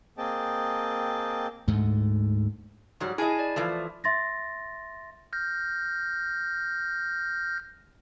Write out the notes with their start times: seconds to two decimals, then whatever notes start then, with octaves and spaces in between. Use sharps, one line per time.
0.18 A#3 C4 G#4 D#5 G5 A5
1.68 D2 G#2 A3
3.00 G#2 F#3 G3
3.18 E4 G#4 D#5 G#5 A5
3.39 D5
3.56 E3 F3 A3
4.04 E5 C6 A6 A#6
5.33 F6 G6 A#6